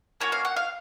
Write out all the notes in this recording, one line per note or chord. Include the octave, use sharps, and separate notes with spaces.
A#3 C#4 F#4 C#5
F5
F#5
F5